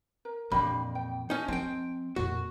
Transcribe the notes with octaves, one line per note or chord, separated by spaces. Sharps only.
A#4
F2 A#2 E3 D4 G4 B5
G5
C#4 D#4 D#5 G#5 A5
F3 C4 G5
F2 A#2 F#4